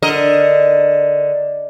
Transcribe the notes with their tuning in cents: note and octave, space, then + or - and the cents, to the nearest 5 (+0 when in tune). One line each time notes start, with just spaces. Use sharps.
D3 +0 A#4 +0 D#5 +0